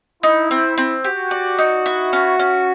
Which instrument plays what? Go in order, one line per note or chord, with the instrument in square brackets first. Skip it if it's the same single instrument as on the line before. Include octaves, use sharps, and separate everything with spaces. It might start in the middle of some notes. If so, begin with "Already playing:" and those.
[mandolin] D#4 [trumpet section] E4
[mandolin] C4
C4
[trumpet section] F#4 [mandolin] G4
[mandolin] D5
D#4
E4
C#4
C#4